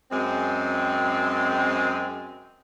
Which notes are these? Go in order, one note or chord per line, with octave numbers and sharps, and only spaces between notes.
F#2 G#3 C4